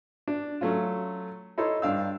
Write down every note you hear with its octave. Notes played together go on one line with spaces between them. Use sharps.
D4
F#3 A3 C#4 F4
D#4 E4 A4 C#5 C6
G2 D4 F5 E6